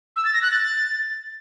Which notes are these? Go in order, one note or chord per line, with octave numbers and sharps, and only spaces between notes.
E6
A6
A#6
F#6
A6